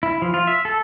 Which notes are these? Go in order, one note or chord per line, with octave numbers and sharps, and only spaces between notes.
E4
F3
F4
E5
A4